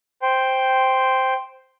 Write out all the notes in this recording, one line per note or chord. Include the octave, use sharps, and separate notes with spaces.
C5 G5